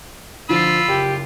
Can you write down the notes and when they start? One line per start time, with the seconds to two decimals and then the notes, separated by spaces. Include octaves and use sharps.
0.49 D3 F3 F4 B5 E6
0.88 F#1 G4